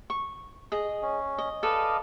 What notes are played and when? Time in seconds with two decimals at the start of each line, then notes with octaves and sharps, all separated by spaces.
0.10 C#6
0.72 G#4 D#5
1.02 C#4
1.38 D#5
1.63 A4 B4 D5 D#5 F5